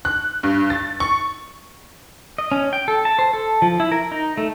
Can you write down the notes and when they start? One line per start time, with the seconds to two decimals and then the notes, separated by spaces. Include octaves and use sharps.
0.05 F#6
0.43 G2
0.70 A6
1.00 C#6
2.38 D#5
2.52 C#4
2.73 G5
2.88 A4
3.05 A5
3.19 C5
3.34 A4
3.62 F3
3.80 E4
3.92 A#4
4.12 D#4
4.37 A3